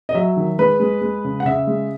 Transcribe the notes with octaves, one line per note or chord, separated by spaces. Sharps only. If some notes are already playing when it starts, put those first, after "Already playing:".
D#5
F#3 E5
D#3
G#3 B4
G#3
G#3
C#3
F#5
C#3 E5
G#3